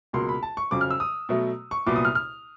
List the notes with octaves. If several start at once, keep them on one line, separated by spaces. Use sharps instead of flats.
C#2 B2 F#3 A#3 C6
B5
A5
C#6
F2 C#3 F#3 D6
F6
E6
D#6
B2 F#3 A3
C#6
C2 A#2 F#3 B3 D6
D#6
F6
F6